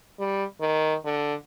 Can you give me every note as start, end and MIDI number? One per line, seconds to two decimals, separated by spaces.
0.19 0.44 55
0.60 0.95 51
1.05 1.35 50